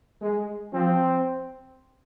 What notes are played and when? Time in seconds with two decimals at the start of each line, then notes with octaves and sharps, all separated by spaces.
0.22 G#3
0.73 F3 C4